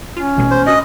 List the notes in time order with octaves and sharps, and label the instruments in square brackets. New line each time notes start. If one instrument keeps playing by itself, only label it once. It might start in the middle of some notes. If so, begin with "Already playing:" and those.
[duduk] C#4 [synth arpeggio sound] F4
[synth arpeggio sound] A1 B2 G#3
[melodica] C5
[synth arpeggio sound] D4 F#4 B4 [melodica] D#5